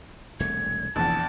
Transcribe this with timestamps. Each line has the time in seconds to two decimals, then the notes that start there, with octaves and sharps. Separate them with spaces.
0.40 E1 C2 A3 G#6
0.96 F1 A#1 E2 E3 A5